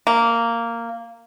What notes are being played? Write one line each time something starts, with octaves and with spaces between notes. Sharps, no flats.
A#3